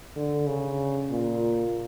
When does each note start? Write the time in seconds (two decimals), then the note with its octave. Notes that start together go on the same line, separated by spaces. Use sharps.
0.16 D3
0.47 C#3
1.10 A#2